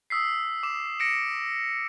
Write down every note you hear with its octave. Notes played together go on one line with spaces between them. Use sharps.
D#6 E6 B6 C7
D6 E7
A#6 C#7 D7 E7